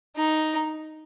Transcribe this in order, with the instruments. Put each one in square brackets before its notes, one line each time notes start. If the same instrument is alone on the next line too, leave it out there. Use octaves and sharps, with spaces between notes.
[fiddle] D#4